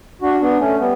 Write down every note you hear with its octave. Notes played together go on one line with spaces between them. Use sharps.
D4 F#4
B3 D4
A3 C#4
G3 B3